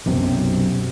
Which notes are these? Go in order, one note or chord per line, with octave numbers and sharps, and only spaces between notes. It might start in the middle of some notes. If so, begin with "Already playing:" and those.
B1 F#2 C3